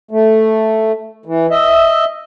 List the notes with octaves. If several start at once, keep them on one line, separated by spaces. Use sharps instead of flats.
A3
E3
D#5 E5